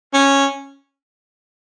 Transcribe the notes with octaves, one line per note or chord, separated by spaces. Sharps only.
C#4